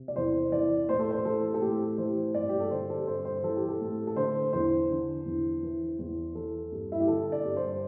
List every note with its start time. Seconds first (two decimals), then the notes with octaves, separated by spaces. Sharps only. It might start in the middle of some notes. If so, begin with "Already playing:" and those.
Already playing: C3
0.08 D5
0.16 E2 C5
0.52 E3 D5
0.89 A2 C5
0.99 A4
1.11 C5
1.25 E3 A4
1.54 A4
1.61 A2 G4
1.98 E3 C5
2.34 G2 D5
2.49 G4
2.60 A4
2.71 D3 C5
2.90 A4
3.07 G2 C5
3.25 C5
3.43 E3 A4
3.57 G4
3.69 A4
3.81 A2
4.07 A4
4.16 D3 C5
4.53 E2 C5
4.90 D3
5.26 E2
5.63 E3
5.99 E2
6.35 E3 A4
6.72 G2
6.92 E4
7.00 G4
7.08 D3 A4
7.32 D5
7.45 G2
7.56 C5